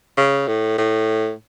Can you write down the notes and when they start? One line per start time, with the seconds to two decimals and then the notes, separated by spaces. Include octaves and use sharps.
0.18 C#3
0.48 A2
0.78 A2